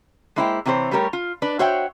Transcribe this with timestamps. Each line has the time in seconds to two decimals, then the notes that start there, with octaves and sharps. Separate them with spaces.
0.36 G#3 A#3 E4 C5 C#5 G5
0.66 C3 E3 C4 F#4 C5 C#5
0.91 G3 A3 G4 A#4 C#5
1.13 F4
1.42 D4 B4 D5
1.59 F#4 C5 C#5 E5 F#5 G5